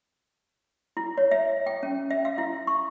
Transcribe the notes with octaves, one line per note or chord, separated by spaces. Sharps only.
E4
C#5
E5
G5
C#4
E5
F5
E4
C#6